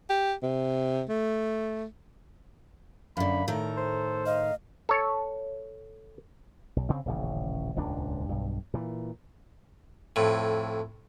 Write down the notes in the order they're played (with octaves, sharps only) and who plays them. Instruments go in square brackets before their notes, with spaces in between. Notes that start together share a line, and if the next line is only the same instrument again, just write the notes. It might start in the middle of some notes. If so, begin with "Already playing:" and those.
[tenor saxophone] G4
C3
A3
[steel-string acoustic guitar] F#2 D3 [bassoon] A#3 [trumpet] B5
[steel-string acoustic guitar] A2 D#3 A#4 [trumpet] A4
[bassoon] C5
[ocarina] D#5 [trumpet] F5
[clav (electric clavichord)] A4 C#5
[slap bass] B1
C#3 C4
D#1 A1 C#3
D#1 C#2 G#2 D4
B1 G2
A#2 E3
[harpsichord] F2 A2